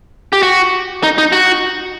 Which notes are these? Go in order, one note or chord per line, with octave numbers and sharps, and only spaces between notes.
G4
F#4
D#4
D#4
F#4